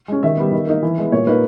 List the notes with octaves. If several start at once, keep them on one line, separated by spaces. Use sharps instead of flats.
G#3 C#4
D#3 E5
G3 B3
D#3
A#3 D#4
E3
G#3 B3
A#2 C#5
A#3 D#4 B4